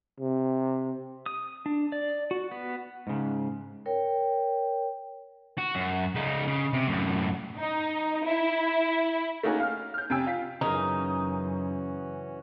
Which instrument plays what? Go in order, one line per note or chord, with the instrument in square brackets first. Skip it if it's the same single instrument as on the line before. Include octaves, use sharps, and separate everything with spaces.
[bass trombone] C3
[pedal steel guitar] D#6
D4
D5
F#4
B3
[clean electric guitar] G#2 C#3
[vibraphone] A#4 C#5 G5
[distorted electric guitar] F#4
F#2
C#3 D#4
C#3
C3
F#2 A2
[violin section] D#4
E4
[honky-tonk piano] A3 A#3 C#4 D#4 F#4 G#4
F5 F6
F6 G6
F2 C3 G5 G#5 E6
F4 B6
[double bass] F#2 [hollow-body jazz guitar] C#3 A#4 [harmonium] E3 C#4 F#4 [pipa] D#4